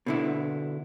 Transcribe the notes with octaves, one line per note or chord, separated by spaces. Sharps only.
B2 D3 E4